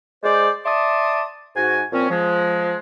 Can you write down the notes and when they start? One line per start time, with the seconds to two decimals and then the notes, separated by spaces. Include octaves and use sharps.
0.23 G#3 C5 D5
0.65 D5 E5 A5 C6 D6 D#6
1.56 G#2 F#4 G#5
1.92 A#2 F3 C4 C#4
2.10 F3 G#3